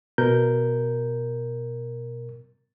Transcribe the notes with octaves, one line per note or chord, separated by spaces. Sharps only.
B2 A#4 G6